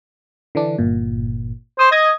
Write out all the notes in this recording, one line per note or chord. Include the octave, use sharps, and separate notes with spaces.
D3 E3 D4
G1 A#2
C5 D#6
D#5 D#6 G#6 A#6